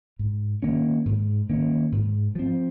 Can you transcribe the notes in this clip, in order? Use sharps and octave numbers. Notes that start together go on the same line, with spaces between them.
G#2
D#3 A#3 C#4
G#2
D#3 A#3 C#4
G#2
F3 C4